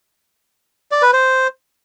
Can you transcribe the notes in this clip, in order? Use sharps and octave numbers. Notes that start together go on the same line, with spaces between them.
D5
B4
C5